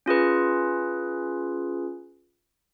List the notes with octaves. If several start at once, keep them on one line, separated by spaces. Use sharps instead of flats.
C#4 F4 G#4 B4